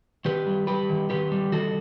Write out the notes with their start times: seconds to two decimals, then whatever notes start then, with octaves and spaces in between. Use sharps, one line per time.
0.25 D#3 G4 B4
0.46 G3
0.67 G3 G4 B4
0.90 D#3
1.10 D#3 G4 B4
1.32 G3
1.52 D#3 F#4 A4